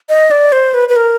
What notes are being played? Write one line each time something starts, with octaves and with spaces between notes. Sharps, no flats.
D#5
D5
C5
B4
B4
A#4